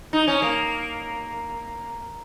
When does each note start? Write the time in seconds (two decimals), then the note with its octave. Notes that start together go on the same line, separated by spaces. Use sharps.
0.13 D#4
0.27 C#4
0.42 A#3